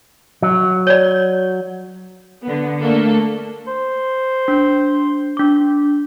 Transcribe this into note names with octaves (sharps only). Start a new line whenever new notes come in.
F#3
C#5 D5
D3 B3
A3 A#3 D4 A4
C5
D4
D4 D6